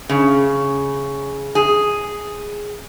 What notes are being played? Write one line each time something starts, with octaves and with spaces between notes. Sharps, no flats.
C#3
G#4